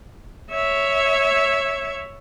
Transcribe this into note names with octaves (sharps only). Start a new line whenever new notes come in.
C#5 E5